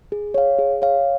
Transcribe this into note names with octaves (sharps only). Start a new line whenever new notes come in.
G#4
C#5 F5
G#4
C#5 F5